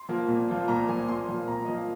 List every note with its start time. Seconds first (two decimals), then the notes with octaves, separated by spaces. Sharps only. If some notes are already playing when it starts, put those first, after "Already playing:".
Already playing: C6
0.09 F3 A#3 F4
0.28 A#2
0.48 F3 A#3 F4
0.68 A#2 A#5
0.88 F3 A#3 F4 G#5
1.08 A#2 C6
1.28 F3 A#3 F4
1.48 A#2 A#5
1.65 F3 A#3 F4 D#5
1.77 F5